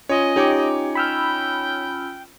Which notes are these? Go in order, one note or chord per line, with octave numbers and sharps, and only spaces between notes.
C#4 F4 C#5 D#5 G#5
D#4 G4 C#5 G5 D6
G5 B5 E6 F6